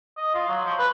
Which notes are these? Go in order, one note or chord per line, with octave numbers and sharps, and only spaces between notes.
D#5
F4
F#3
F3
B4